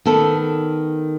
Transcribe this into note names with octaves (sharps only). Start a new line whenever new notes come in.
D#3 B3 A4